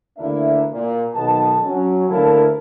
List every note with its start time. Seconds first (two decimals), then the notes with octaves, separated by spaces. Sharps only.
0.18 D2 A#3 D4 E4 E5
0.72 A#2
1.14 B1 D#3 B3 D#5 A5
1.64 F#3 C#4
2.09 D2 A#3 E4 A#4 F5 A5